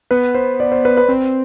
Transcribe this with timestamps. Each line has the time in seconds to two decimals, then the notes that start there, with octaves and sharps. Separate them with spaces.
0.11 B3 B4
0.34 C5
0.60 D5
0.72 C5
0.85 B4
0.97 B4
1.08 C4 C5